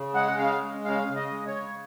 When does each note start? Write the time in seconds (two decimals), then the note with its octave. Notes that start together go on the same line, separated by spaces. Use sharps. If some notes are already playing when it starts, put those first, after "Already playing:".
Already playing: C#3
0.14 G#3 F#5
0.38 C#3 F5
0.62 G#3
0.85 C#3 F5
1.08 C#3
1.16 D#5
1.31 G#3
1.47 C#5
1.56 C#3